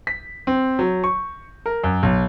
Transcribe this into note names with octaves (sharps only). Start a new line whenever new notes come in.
B6
C4
F#3
C#6
A#4
F#2
B1